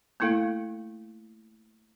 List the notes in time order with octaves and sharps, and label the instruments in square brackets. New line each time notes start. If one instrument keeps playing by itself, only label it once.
[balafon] A3 A#3 E4 A4 F5